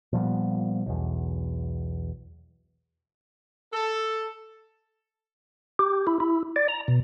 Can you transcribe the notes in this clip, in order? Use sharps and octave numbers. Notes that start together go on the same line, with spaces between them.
A#2 F3 G3 B3
B1 E2
A4
G4
E4
E4
D5
A#5
B2